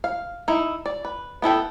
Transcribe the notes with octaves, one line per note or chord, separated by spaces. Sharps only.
F5
D#4 E4
D5
B4
B3 E4 A4 G5